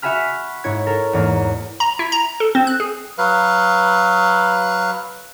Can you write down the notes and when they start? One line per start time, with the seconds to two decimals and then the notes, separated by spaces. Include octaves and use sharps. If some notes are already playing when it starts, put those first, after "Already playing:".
0.02 F#4 E5 G#5 B5 F6
0.64 G#2 E4 C#5 G#6
0.87 A4 A#4
1.13 E2 G#2 A#3
1.80 A#5
1.99 E4
2.12 A#5
2.40 A4
2.55 C4
2.67 F#6
2.80 G#4
3.18 F#3 B4 F5